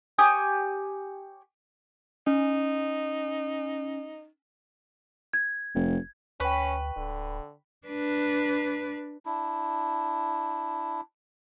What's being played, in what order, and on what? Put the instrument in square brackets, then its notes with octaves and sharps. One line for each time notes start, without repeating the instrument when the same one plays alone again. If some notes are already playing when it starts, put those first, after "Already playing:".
[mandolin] G4 C#5 G#5 D#6
[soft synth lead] C#4 [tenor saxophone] D#4
[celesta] G#6
[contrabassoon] F1
[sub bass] D2 [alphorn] C#4 [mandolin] B4 [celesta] G5 C#6
[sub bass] D1 [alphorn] D3
[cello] D4 B4
[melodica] D4 E4